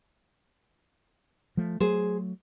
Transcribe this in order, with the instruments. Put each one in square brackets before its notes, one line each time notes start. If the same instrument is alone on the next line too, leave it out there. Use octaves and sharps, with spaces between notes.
[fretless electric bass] F3 A3
[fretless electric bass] F#3 A3 [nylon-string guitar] G#4 C5